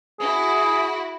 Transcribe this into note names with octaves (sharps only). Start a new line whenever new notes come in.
E4 F#4 G#4